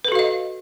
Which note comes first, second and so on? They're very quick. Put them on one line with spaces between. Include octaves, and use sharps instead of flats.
B4 A4 F#4 F5 D#5